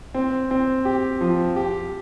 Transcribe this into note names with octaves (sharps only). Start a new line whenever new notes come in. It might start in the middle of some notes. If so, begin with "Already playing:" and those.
C4
C4
G4
F3
G4